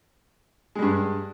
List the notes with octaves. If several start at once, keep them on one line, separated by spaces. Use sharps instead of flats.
G2 G3 G#3